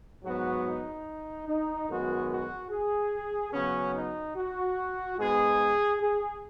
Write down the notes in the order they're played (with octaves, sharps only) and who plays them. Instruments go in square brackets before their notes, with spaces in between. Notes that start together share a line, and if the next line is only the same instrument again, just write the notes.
[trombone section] G#2 F#3 B3 F#4
D#4
D#4
F#2 D#3 G#3 B3 F#4
F#4
G#4
C#3 F#3 B3 C#4
D#4
F#4
G#2 G#3 B3 G#4
G#4